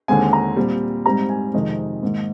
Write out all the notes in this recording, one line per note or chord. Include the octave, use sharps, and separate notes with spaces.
D#2 D3 G#3 C4 G#5
A#5
A#2 G3 C4
G#2 G3 C4 A#5
G#5
F2 C3 D#3 G#3 D#5
G#2 D#3 A#3